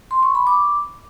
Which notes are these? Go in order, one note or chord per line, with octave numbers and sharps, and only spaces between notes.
C6
C#6
B5
D6